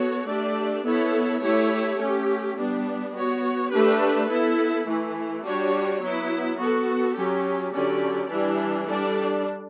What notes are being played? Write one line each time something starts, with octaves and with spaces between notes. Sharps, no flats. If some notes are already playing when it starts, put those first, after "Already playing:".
Already playing: B3 F#4 A4 C#5
A3 D4 G4 D5
B3 E4 A4 C#5
A3 E4 G4 C#5
A3 C#4 G4
G3 B3 D4
B3 F#4 C#5
A3 D4 G4 B4
B3 E4 A4
E3 A3 E4
G3 D4 F#4 C#5
F#3 B3 E4
B3 F#4 A4
F#3 C#4 G4
D3 F#3 C#4 G4 D5
E3 G3 D4
G3 D4 A4 D5